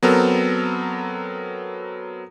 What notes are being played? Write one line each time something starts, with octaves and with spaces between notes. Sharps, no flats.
F#3 B3 C4 A4 A#4